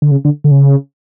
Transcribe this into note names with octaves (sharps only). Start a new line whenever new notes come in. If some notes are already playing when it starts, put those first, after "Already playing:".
D3
C#3
D3
D3
C#3